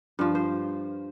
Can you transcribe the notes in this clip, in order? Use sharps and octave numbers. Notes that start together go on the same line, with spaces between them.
G2 F3
C5